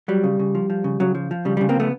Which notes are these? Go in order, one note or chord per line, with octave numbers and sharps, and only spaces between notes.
F#3 G3
C#3
C#3
F3
F3
C#3
C#3 F#3
F3
F3
C#3 G3
C#3 G3
A#3 C4
F3 A3 B3